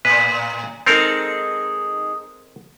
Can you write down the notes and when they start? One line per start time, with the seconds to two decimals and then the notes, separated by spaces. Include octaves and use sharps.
0.05 A2 B4
0.86 G#3 C4 D#4 A4 A#4